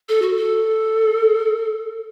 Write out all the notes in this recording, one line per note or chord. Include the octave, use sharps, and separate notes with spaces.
A4
F#4
A4